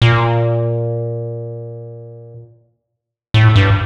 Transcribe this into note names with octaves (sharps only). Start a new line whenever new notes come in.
A#2
A2
G2